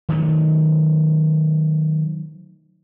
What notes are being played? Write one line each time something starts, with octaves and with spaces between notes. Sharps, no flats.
D#3 F#3 A3